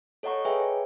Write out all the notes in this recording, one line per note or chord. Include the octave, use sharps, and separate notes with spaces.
A4 C#5 D#5 F#5 A#5 C#6
G#4 B4 C#5 E5 G5 G#5